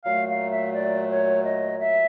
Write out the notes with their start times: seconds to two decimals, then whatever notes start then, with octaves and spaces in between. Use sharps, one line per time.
0.04 A#2 F#3 A3 F5
0.29 F5
0.51 E5
0.75 D5
1.09 C#5
1.43 D#5
1.78 E5